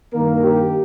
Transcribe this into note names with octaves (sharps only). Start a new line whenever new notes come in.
G2 D#3 A#3 A#4
G4